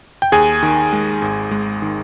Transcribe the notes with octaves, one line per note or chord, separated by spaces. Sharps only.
G5
D#2 G#4 G#5
D#3
G#3
G#1
G#3
D#3